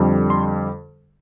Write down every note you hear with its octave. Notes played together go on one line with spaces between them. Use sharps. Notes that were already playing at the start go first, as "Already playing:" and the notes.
Already playing: F2 D3 G3
C6